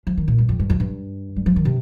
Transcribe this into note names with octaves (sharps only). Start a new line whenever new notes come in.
F3
D#3
A#2
G2
F2
G2
F2
G2
G3
F3
D#3
C3